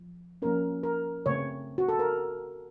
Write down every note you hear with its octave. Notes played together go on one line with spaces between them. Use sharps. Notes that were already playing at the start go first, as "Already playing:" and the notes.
Already playing: F3
F3 A#3 C#4 A#4
A#4
C#3 A3 C4 C#5
F#4
A4
A#4